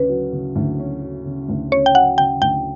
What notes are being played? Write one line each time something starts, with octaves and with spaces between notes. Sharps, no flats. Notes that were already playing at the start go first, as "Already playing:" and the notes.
Already playing: D2 C#3 C#4 B4
F#3
C#3
D2
C#4
F#3
C#3
D2
C#4 C#5
G5
F#3 F#5
C#3 G5
D2 G5